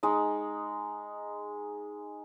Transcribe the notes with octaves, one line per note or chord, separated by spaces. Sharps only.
G#3 D#4